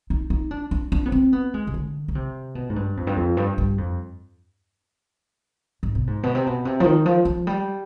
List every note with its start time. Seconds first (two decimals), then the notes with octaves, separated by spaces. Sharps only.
0.10 D#4
0.30 D#4
0.51 D4
0.71 D4
0.92 D4
1.06 B3
1.12 C4
1.33 B3
1.54 G#3
1.67 C3
1.74 D3
2.08 D3
2.15 C3
2.55 B2
2.70 G#2
2.76 G2
2.97 F2
3.07 G2
3.17 F2
3.37 G2
3.58 G2
3.78 F2
5.83 G#2
5.95 B2
6.07 G#2
6.23 B2
6.35 C3
6.46 B2
6.65 C3
6.80 F3
6.85 D#3
7.06 F3
7.25 F3
7.47 G3